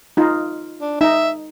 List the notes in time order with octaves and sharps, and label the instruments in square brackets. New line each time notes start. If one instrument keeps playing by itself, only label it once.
[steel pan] D#4 F4
[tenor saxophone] D4
[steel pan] D#4 [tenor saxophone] E5